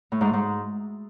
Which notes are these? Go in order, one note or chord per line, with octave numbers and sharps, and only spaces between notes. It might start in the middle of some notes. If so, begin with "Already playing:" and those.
A2
G#2
G#2